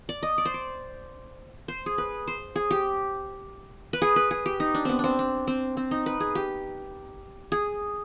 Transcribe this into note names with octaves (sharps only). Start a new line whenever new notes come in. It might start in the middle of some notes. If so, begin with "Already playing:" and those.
D5
D#5
D5
C5
D5
C5
G#4
B4
C5
G#4
G4
B4
G#4
B4
G#4
G4
D#4
D4
B3 C4
C4 D4
D4
C4
C4
D#4
B4
G#4
G4
G#4